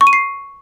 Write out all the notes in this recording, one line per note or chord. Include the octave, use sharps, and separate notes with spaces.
C#6
D#7
C7